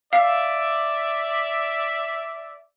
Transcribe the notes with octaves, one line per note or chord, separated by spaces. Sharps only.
D5 E5 F5